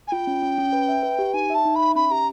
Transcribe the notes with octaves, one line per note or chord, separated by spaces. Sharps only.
G#5
F4 G5
C#4
C#4
C#4
B4
E5
B4
G4
D#4 G#5
E5 A5
D#4
E5 B5
C#4 B5
G4 A#5